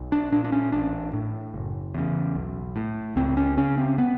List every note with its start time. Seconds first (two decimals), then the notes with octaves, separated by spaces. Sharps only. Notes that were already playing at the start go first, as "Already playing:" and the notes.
Already playing: B1
0.12 D4
0.32 A#2 D4
0.44 D4
0.52 C#4
0.72 A1 D4
1.14 A2
1.54 F#1
1.95 E2 C#3
2.35 B1
2.76 A2
3.16 C#2 C4
3.37 C#4
3.57 C#3 C#4
3.78 C4
3.98 B3